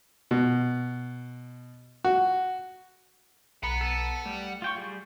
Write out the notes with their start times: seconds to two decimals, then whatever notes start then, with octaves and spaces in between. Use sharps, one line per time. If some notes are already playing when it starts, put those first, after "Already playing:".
0.31 B2
2.05 F#4
3.63 B1 F#5 A#5 B5 C#7
3.81 A4
4.25 G3 A3
4.62 F4 G5 C#6
4.76 G3 G#4